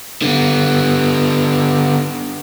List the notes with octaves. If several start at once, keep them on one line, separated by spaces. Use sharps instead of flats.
D3 B3